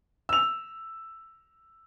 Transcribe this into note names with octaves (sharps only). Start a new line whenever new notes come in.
E6 F7